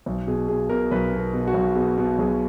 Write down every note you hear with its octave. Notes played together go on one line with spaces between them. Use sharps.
B1
B2 G#4
B2 G#4
B2 A#4
B1 B4
B2
A#4
B2
F#4
B1
B2 G#4
B2
B1 G#4